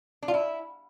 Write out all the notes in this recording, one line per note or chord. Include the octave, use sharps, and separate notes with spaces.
D4
F4
E4